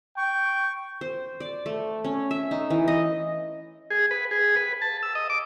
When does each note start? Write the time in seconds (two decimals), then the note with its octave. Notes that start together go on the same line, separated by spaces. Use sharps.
0.17 G5 C#6
1.01 C5
1.40 D5
1.66 A3
2.04 C#4
2.31 E5
2.51 D#4
2.70 E3
2.88 D#5
3.90 G#4
4.11 B4
4.31 G#4
4.56 B4
4.82 A5
5.03 E6
5.15 D#5
5.30 D6